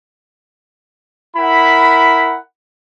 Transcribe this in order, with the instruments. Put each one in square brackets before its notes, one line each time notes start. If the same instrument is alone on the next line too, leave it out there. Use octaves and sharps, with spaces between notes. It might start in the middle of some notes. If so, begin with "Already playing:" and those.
[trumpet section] E4 A#4 F#5 B5